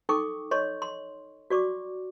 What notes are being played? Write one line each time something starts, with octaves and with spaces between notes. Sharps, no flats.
D#4 A4 G5 C#6 D6
C#5 D#5 C6 C#6
C6
F#4 D5 C#6 D6